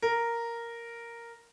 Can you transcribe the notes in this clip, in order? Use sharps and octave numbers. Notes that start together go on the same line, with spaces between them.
A#4